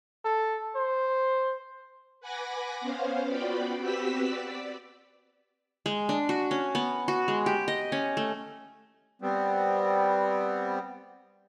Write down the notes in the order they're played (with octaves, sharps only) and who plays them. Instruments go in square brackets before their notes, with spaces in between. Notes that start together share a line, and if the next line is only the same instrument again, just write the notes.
[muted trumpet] A4
C5
[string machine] B4 F#5 G#5 B5 D6 A#6
B3 C#4 C5 F5
B3 F4 F#4 D5 G5 B5
C4 F#4 G4 B4 E6 B6
D5
[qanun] G#3
D4
F#4
C#4
B3
F#4
G#3
G4
D#5
C#4
A3
[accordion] G3 B3 C4